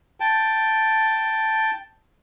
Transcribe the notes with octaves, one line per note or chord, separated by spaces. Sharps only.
G5 A5